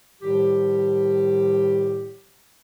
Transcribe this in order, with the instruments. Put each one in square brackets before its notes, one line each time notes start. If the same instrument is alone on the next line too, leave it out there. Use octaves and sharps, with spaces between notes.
[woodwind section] A2 D#3 F3 G3 G4